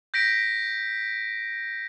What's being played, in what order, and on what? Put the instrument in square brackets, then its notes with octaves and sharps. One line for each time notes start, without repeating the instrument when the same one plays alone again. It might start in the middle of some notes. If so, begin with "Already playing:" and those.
[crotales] G6 A#6 B6 D7